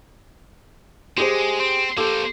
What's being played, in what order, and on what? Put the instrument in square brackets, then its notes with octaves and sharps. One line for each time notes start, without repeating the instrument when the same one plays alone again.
[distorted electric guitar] G#3 [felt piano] G4 G#4 C5
[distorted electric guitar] C4
[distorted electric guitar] A#3 C5 [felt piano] G4 A4 D6